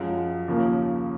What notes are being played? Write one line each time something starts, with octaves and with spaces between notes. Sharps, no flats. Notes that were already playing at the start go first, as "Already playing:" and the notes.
Already playing: F#2 F3 G#3
D#2 C#3 F3 A#3